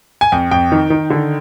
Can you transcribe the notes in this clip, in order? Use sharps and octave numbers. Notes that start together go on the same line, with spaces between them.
G#5
F2 G5
F2 G5
D#3
D#3
D3